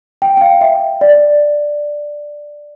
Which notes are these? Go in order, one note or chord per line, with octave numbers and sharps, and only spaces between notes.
G5
G5
F5
E5
D5